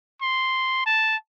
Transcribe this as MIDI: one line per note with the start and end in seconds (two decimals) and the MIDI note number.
0.22 0.86 84
0.86 1.17 81